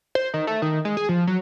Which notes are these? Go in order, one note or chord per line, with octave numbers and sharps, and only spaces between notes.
C5
D#3
A3
D#3
G#3
G#4
F3
F#3